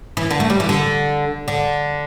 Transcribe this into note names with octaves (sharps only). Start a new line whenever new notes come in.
E3
D3
A3
G3
E3
D3
D3